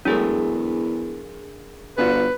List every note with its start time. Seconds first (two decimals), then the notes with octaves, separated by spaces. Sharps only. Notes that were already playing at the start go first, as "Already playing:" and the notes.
0.05 E2 F#3 G#3 A3 D4 G#4 A#4
1.98 G1 G3 F4 F#4 B4